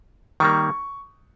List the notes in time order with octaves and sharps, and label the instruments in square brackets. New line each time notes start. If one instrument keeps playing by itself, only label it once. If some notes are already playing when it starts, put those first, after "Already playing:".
[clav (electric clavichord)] D#3 G3 A#3 [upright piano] C#6